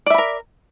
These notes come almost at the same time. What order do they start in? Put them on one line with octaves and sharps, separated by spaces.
D5 E5 B5 A#4